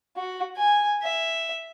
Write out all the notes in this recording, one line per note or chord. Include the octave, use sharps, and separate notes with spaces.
F#4
G#5
E5